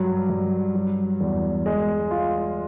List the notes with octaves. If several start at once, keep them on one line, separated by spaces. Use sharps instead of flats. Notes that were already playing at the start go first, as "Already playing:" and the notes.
Already playing: G2 F#3
G2
F#3
E2
G#3
F4